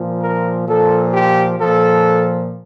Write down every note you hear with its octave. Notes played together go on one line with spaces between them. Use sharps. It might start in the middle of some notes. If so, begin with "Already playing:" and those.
Already playing: A#2 F3
A#4
A#2 F3 A4
G4
A#2 F3 A4